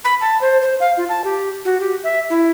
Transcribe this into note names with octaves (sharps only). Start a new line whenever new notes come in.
B5
A5
C5
C5
F5
F4
A5
G4
F#4
G4
E5
E4